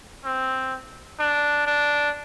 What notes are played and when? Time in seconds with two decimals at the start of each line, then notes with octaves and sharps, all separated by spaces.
0.25 C4
1.19 D4
1.66 D4